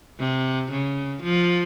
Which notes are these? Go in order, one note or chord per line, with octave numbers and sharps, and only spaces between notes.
C3
C#3
F3